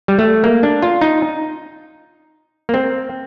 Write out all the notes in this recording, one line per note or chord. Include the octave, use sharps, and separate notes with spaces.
G3
A3
A#3
D4
F4
D#4
A#3
C4